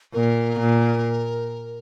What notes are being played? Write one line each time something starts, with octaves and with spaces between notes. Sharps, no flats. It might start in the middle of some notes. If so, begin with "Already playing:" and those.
A#2 A#4
A#2